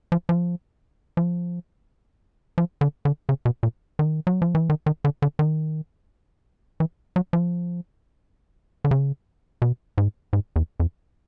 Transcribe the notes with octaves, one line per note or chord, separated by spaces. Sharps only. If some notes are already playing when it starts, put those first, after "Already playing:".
F3
F3
F3
F3
D3
D3
C#3
B2
A#2
D#3
F#3
F3
E3
D#3
D#3
D3
D3
D#3
E3
F#3
F3
D3
C#3
B2
G#2
G#2
E2
F2